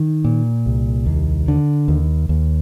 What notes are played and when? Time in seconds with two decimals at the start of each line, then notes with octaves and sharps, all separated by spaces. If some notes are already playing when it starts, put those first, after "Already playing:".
Already playing: D#3
0.24 A#2
0.66 C2
1.06 D#2
1.48 D3
1.88 D#2
2.29 D#2